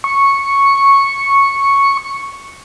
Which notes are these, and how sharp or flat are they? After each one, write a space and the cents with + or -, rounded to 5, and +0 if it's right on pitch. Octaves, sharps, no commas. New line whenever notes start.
C#6 -5